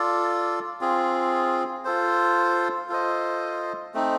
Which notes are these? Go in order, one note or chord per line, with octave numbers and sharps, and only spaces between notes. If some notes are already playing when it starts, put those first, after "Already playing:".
Already playing: F4 A4 D5
C4 F4 G#4
F4 A4 C5
F4 A4 C5 D#5
A3 C4 D#4